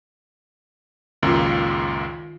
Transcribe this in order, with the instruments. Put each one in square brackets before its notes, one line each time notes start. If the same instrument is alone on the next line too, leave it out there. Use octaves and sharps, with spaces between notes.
[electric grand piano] C#2 F#2 A#2 [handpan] D#3 F4